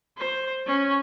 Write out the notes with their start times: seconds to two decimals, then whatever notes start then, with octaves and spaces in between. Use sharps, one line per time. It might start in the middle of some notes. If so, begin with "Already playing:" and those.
0.17 C5
0.66 C#4